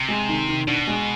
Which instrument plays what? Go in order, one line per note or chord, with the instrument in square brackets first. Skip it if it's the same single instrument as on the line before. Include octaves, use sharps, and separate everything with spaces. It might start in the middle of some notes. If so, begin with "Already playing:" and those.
Already playing: [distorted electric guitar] C3
[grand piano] G#3
D#3
D#3
[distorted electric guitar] B2 [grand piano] D4
[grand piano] G#3